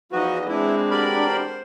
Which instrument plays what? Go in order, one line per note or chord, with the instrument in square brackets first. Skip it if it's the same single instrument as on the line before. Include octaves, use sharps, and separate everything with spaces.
[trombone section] E2 B4 [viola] F3 D#5 [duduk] D#4 [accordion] F#4
[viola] G#3 C4 [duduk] D4 [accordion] E4
[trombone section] A1 F#4 G4 [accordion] A#4 D5 B5
[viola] C5